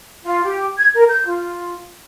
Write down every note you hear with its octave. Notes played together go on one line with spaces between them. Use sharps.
F4
G4
G#6
A#4
G6
F4